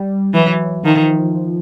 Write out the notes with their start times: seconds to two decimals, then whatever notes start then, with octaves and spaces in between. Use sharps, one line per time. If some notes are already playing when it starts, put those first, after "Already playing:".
Already playing: G3
0.34 E3 F#3
0.83 D#3 F3